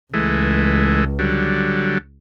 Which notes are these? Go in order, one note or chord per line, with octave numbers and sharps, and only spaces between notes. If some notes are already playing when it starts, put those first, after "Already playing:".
C#2 E3 G#3 A3
D3 F#3 G3